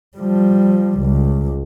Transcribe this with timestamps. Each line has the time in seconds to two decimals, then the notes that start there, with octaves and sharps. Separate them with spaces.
0.17 F3 G3
0.99 C#2